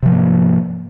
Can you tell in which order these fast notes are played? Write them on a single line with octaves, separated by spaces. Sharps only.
C3 F3 G#2 A#3